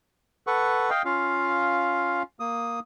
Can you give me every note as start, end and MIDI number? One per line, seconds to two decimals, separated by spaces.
0.47 0.90 69
0.47 0.90 71
0.47 0.90 78
0.47 0.90 85
0.90 1.02 75
0.90 1.02 77
0.90 1.02 79
1.05 2.23 61
1.05 2.23 65
1.05 2.23 77
2.40 2.80 58
2.40 2.80 87